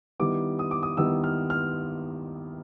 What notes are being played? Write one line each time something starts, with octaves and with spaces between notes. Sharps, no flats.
D#3 G3 B3 E4 D6
D#6
D6
D#6
D#3 G3 B3 E4 E6
F6
F6